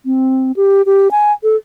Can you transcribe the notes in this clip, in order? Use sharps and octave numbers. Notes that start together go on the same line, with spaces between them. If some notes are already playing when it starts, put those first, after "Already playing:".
C4
G4
G4
G#5
A4